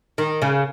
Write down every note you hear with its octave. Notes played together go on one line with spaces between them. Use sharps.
D#3
C#3